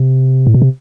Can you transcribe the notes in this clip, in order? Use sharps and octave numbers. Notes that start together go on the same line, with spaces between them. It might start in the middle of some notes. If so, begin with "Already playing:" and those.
Already playing: C3
A2
B2
C3